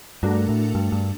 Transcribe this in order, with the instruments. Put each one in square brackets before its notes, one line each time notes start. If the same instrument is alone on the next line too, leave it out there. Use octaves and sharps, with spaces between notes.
[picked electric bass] G2 [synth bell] A3 D4 F#4 A#4
[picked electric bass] A2
G2
G2